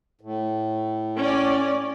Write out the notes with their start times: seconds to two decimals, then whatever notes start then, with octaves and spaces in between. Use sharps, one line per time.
0.21 A2
1.22 C#4 D5